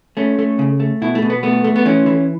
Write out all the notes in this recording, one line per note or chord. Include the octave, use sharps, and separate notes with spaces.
A3 C#4
A3
C#3
A3
B2 E4
A3
B2
B3
A3 B3
A3
B3
E3 C#4
E3